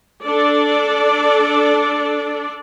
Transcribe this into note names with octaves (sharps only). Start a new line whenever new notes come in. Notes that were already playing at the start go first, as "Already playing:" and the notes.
D4 A4 D5